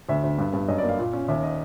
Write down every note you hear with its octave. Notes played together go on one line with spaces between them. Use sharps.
D2 E5
D2
G2
G2
F#2 D#5
D5
A#3
F5
A#2
C#4
D#2 E5
D#5